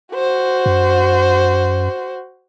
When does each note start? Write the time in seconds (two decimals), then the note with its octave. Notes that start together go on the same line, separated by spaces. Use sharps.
0.14 F#4 C5
0.66 F#2